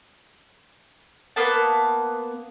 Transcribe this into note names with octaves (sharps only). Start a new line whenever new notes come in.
A#3 B3 A5